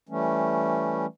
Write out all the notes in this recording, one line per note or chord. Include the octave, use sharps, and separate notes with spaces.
E3 G3 A3 C#4